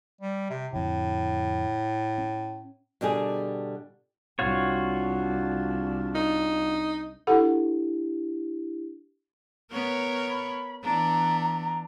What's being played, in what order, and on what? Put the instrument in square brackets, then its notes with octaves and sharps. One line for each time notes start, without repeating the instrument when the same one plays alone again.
[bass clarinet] G3
C3
[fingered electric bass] F2 D3 [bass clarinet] A2
[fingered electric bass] C#4
[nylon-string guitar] B2 D3 G3 D4 G4 G#4
[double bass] C2 D4 [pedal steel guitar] F4 F#4 C#5
[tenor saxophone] D#4
[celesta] D4 E4 G4 [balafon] A4 F#5
[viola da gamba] B3 A#4 C#5
[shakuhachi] B5
[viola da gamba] E3 B3 D4 [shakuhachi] A#5